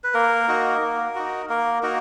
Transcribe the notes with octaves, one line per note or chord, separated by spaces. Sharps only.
B4
A#3 A#4
D#4 F#4
A#3
D#4 F#4
A#3 A#4
A#3 D#4 F#4 A#4